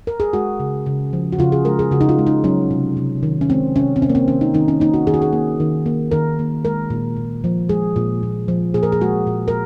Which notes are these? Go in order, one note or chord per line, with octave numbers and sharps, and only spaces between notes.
A#4
G#4
G#3 F#4
C#3
C#3
F3
F#4
C#3 F4
G#4
G#3 A#4
G#4
C#3 F#4
D#4
F4
G#3
D#4
F#3 C#4
C3
C3
D#3
C#4
G#3 C4
C3 C#4
C4
C3 C#4
A#3
C4
D#3 C#4
D#4
D#3 D#4
C#4
A#3 D#4
F#4
D#3 G#4
F#4
G#4
A#3
D#3
A#3
D#3 A#4
A#3
G#3 A#4
A#2
A#2
F3
G#3 G#4
A#2
A#2
F3
A#2 G#4
A#4
G#4
G#3 F#4
A#2
A#4